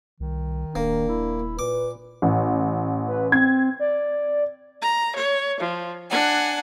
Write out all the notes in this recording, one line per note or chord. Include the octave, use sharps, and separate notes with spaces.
C2 D#3
D#1 A#3 D4
E4
A#2 B4 D6
A1
B4
C4 G#6
D5
A#5
C#5
F3
D4 F#5 G#5